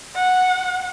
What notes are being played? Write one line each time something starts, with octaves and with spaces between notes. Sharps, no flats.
F#5